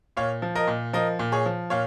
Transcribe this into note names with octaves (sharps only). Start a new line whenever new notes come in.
A#2 C#5 F5
F3
A#4 D#5
A#2
F3 A#4 D#5
A#2
G#4 C#5
F3
A#2 C#5 F5